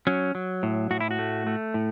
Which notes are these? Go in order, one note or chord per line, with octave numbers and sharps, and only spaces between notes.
F#3 C#4
F#3
A2
A2 F#4
E4
F#4
A3
A3
A2